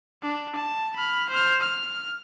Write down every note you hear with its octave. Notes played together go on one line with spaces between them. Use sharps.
D4
A5
B5 F6
C5 F6
F6